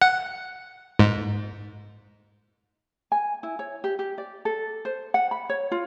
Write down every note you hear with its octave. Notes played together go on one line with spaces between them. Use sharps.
F#5
G#2
G#5
E4
C#5
G4
G4
D5
A4
C5
F#5
B5
C#5
F4